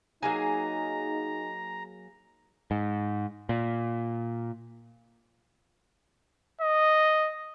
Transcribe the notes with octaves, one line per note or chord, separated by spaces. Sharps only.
F#3 A#3 D#4 G#4 A#5
G#2
A#2
D#5